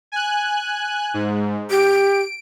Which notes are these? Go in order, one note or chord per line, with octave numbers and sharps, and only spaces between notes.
G#5 F#6
G#2
G4 D7